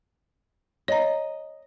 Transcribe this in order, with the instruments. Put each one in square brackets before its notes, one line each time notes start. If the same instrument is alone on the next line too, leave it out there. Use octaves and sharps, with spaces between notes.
[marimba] C#5 A#5 [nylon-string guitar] D#5